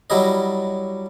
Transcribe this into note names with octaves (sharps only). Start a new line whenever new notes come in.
F#3 G3 E4 D#5